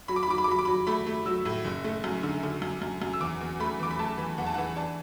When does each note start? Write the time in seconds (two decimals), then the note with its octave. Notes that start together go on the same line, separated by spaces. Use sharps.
0.08 F#3 B5
0.16 D6
0.23 B5
0.28 F#3 D6
0.38 B5
0.44 D6
0.48 F#3 B5
0.59 D6
0.65 F#3 B5
0.87 A3 B5
1.07 A3
1.26 F#3 E6
1.45 A2
1.65 F#1
1.84 A3
2.04 F#2
2.23 D3
2.43 D3
2.62 F#2
2.82 F#2
3.02 F#2
3.13 E6
3.20 E2 D6
3.41 E2
3.60 A3 B5
3.80 E2 D6
3.91 B5
3.99 A3 A5
4.18 E3
4.38 E2 F#5
4.46 A5
4.54 F#5
4.58 E3
4.76 D4 A5